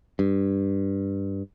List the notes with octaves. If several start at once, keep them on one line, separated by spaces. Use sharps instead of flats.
G2